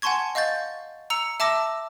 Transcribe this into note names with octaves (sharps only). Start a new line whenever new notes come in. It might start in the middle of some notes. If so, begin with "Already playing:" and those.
F#5 G#5 A5 C6 C#6 G#6
D#5 F5 C#6 G6 A6
A#5 E6 C#7 F7
E5 A5 D6 E6 A#6